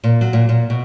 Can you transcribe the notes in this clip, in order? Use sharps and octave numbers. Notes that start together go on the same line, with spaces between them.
A#2
F#3
A#2
A#2
B2